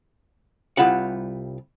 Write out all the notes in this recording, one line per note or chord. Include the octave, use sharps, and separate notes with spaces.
C2 C#3 G3 E4 F4 F#5